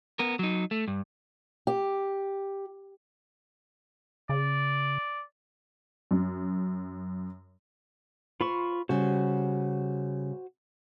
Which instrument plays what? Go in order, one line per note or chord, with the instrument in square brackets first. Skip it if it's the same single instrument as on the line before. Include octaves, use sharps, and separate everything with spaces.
[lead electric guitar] B3 A#4
F#3 D#4
A3
G2
[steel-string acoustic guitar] G4
[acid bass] C#3 [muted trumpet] D5
[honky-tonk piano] F#2
[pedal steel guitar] F4 B5 C#6 [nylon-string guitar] C5
[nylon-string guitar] C#3 G3 [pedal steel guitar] F#4 C5